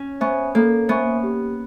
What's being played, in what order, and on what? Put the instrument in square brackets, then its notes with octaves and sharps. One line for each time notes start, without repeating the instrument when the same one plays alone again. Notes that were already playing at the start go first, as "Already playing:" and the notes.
Already playing: [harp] C#4
[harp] B3 [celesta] C5 E5 G#5 C#6
[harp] A#3 [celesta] A4
[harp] B3 [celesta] C5 E5 G#5 C#6
[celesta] G4